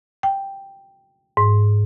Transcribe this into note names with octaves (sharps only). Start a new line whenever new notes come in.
G5
G#2